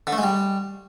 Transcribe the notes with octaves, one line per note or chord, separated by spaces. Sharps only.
D3
A3
G#3
G3